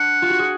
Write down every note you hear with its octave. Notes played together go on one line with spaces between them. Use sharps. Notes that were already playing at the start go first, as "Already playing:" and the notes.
Already playing: D4 F#5
F4
F#4
G#4